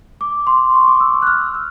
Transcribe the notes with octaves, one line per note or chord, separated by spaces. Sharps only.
D6
C6
C#6
D6
E6
E6
F#6
F6
E6